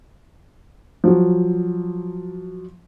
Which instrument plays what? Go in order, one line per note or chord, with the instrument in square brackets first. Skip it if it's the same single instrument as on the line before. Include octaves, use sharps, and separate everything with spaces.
[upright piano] F3 F#3